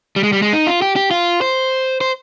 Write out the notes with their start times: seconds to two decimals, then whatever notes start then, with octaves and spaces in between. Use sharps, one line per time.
0.16 G3
0.23 G#3
0.33 G3
0.42 G#3
0.53 D#4
0.67 F4
0.82 G4
0.96 G4
1.11 F4
1.41 C5
2.01 C5